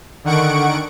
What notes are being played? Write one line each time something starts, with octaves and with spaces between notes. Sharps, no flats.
D3 D#3 F#5 C#6 D7